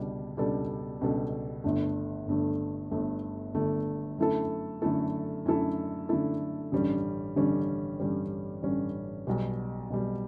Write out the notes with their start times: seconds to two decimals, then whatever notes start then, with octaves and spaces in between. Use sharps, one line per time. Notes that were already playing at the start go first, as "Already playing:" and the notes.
Already playing: C#2 B2 G3 D4
0.37 C#2 B2 G3 D4 A4
1.01 C#2 B2 G3 D4 A4
1.64 G1 G2 D3 A3
2.27 G1 G2 D3 A3
2.91 G1 G2 D3 A3
3.54 G1 G2 D3 A3
4.18 F#2 D3 A3 E4 A4
4.82 F#2 D3 A3 E4 A4
5.46 F#2 D3 A3 E4 A4
6.09 F#2 D3 A3 E4 A4
6.72 A1 G2 D3 G3 C#4
7.36 A1 G2 D3 G3 C#4
8.00 A1 G2 D3 G3 C#4
8.63 A1 G2 D3 G3 C#4
9.27 B1 B2 G3
9.90 B1 B2 G3